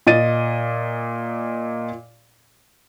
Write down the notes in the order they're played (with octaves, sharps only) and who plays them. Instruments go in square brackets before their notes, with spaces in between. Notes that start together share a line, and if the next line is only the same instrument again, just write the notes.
[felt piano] A#2 D#5 A6 D#7